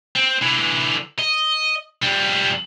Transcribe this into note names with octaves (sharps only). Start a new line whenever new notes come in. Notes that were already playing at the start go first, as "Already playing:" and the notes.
C4
D3 E3
D#5
F2 G3